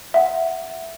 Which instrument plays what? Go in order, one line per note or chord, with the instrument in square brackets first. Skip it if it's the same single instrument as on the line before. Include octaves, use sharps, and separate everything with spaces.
[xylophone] E5 F#5